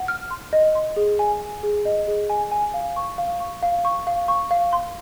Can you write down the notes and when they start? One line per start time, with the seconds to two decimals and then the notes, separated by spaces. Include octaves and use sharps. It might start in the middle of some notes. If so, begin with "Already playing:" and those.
Already playing: F#5
0.08 F6
0.31 C6
0.53 D#5
0.75 C6
0.96 G#4
1.19 G#5
1.41 G#5
1.63 G#4
1.85 D#5
2.08 G#4
2.30 G#5
2.52 G#5
2.74 F5
2.96 C#6
3.18 F5
3.40 C#6
3.63 F5
3.85 C#6
4.07 F5
4.28 C#6
4.51 F5
4.73 C6